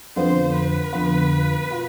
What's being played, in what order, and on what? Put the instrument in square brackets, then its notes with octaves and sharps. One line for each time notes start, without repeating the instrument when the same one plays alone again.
[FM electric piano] F2 D3 F3 B3 F4 [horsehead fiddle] C5
[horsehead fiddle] B4
[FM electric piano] F2 D3 F3 B3 F4
B2 B3 F4